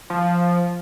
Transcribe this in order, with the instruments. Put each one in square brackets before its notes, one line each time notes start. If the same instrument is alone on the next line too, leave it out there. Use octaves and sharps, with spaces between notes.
[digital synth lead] F3